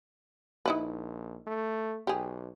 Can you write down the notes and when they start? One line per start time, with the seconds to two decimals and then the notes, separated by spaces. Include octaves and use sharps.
0.66 A#1 D#4 E4 B4
1.47 A3
2.07 B1 G4 G#4